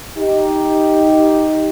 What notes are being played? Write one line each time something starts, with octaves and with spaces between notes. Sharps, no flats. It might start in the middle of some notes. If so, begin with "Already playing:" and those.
D#4 G4